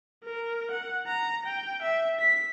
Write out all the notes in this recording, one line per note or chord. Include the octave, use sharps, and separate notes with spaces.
A#4
F#5
A#5
G5
E5
B6